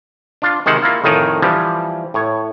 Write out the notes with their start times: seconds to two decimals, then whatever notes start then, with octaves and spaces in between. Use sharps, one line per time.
0.42 D4 F4
0.66 C3 D#3 G#3 C5 F#5
0.82 A#3 E4 F4
1.04 F2 A2 D#3 D#4 G#5
1.42 E3 F3 G3
2.14 A2 C#5